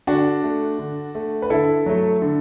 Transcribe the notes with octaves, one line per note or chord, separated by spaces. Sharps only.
D3 D4 F#4
A3
D3
A3
B4
D3 E4 A4
F#3 A3
D3